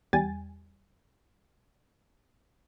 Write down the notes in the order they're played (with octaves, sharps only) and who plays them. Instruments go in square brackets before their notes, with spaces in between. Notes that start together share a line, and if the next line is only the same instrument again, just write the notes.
[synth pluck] E2 G3 G5 G#5 A6